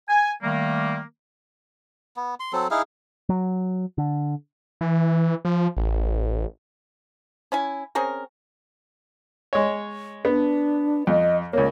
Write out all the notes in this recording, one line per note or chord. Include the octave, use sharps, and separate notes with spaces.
G#5
D#3 G3 A3 A#3
B3
C6
F#3 C4 A4
D#4 E4 G#4 F5
F#3
D3
E3
F3
A1
C#4 E4 G#5
C4 C#4 G#4 A#4
G#3 C#5
B3 D4
F2 D#5
C#2 A#3 C#5